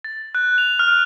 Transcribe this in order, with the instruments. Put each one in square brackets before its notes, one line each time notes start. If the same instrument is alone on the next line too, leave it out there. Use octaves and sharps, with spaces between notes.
[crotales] A6
F#6
F7
F6